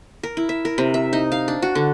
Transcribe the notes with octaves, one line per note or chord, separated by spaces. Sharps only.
A#4
E4
E5
A#4
C3
E5
D#4
F5
D4
F#4
D3